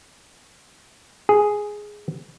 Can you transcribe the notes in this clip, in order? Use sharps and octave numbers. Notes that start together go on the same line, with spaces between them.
G#4